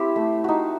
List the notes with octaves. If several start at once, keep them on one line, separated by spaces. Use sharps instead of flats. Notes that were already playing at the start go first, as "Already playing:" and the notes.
Already playing: C4 E4 G4 C5
A3
D#4 F#4